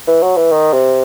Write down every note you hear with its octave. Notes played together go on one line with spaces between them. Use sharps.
E3
F#3
E3
D#3
C3